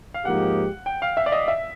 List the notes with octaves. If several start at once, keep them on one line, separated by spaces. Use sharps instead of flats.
F5
G#2 F3 A#3 D#4 G4 F#5
G5
F5
E5
D5
D#5
E5